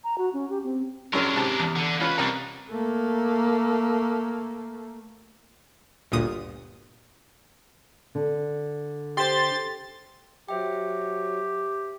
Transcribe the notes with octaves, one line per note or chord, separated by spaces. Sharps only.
A#5
F#4
C#4
G4
C4
F#2 G#3 C#4 D4 A#4
G#2 C3 A5
E2
D3
C#2 C#4 F4 B4 B5
C2 D4 D#4 A#4
A3 A#3
G1 D2 A#2 D#6
D3
G4 C5 C6 A6
F#3 G4 C5 E5 G5